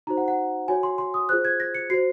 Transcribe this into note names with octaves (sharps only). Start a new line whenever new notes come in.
D#4 F#4 C5 A#5
F#5
F#5
F#4 C#5 G#5
C6
C6
D#6
F4 G#4 C5 F#6
G#6
A#6
C#7
F#4 C5 C7